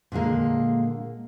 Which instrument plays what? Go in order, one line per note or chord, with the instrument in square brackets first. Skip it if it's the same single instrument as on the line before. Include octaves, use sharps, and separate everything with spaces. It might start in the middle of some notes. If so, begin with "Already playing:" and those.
[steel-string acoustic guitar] A#2 D3 G#3 A#3